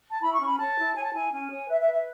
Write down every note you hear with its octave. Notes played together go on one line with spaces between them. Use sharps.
A5
E4 B5
C#6
C#4
B5
C#5 A5
E4
C#5 G#5
A5
E4 G#5
C#4 G#5
C#5
B4 E5
E5
B4
E5